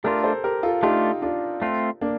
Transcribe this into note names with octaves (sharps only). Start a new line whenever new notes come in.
A3 D4 F4 G4 A#4
A4 C5
G4 A#4
F4 A4
A3 D4 D#4 F4 G4
D4 F4
A3 C4 F4
A#3 D4